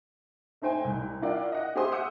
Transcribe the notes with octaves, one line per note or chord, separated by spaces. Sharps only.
A3 D#4 C5 G5 G#5
C2
E4 F4 A#4 D5 F#5 G5
D#5 F#5
G4 G#4 C5 E5 C6 D#6
F#5 D#6 E6 G6 C#7